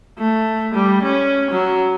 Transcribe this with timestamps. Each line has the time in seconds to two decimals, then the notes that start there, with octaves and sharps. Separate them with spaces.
0.18 A3
0.75 G3
1.03 C#4
1.51 F#3